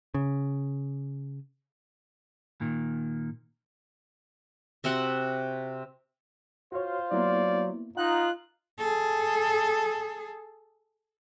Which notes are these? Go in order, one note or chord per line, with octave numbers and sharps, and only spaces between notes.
C#3
A#2 D#3
C3 C4 F#4 F#5
F4 F#4 C5 C#5
F#3 A#3 B3 E4 D5
D#4 F4 F#5 F#6
G#4 A4